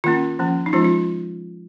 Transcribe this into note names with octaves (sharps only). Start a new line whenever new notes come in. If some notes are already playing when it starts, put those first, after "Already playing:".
D#3 A#3 C#4 F4
F3 A#3 C#4
D#4
F3 G#3 C#4 F4
F4